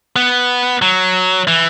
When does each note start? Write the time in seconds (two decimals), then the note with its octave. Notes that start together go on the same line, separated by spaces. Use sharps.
0.16 B3
0.82 F#3
1.47 E3